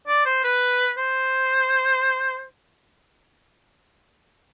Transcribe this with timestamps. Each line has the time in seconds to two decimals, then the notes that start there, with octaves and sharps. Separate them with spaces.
0.07 D5
0.26 C5
0.44 B4
0.98 C5